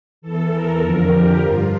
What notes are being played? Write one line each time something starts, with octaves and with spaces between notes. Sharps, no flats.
E2 E3 A4
A#4
F2 D3 F3
G4
G2 F3 F4